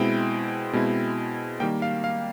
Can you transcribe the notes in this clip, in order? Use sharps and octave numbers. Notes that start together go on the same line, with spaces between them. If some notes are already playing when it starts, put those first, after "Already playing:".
Already playing: B2 G#3 C4 E4 G5
B2 G#3 C4 E4
D#3 G3 A#3 G5
F5
F5